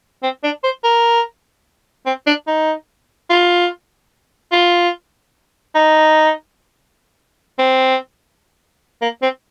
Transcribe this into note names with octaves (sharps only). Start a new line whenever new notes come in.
C4
D4
C5
A#4
C4
D4
D#4
F4
F4
D#4
C4
A#3
C4